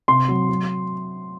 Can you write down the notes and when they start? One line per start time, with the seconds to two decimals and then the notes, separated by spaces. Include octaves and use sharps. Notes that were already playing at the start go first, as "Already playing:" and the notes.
0.08 C3 C6
0.28 F#3
0.49 F#3